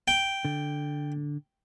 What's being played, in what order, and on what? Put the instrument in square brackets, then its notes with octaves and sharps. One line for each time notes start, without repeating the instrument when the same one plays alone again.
[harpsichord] G5
[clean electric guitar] D3